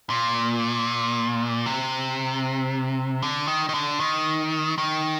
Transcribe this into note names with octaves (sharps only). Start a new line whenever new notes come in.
A#2
C3
D3
D#3
D#3
D3
D#3
D#3